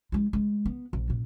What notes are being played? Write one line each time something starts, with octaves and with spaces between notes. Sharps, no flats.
G#3 E4
G#3 A3
B3
A#1
F#2 A#2